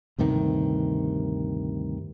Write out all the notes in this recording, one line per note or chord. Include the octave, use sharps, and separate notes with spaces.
D2 G2 C3 D#3